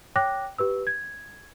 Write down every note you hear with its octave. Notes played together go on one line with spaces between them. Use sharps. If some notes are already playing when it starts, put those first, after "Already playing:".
C#5 G5 D6 F#6 A#6
G4 B4 E6
G#6